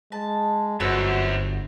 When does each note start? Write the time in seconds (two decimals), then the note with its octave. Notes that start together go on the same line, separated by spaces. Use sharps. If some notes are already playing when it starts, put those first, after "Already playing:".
0.12 G#3 A5
0.80 G1 F#2 C4 F#4 B4 E6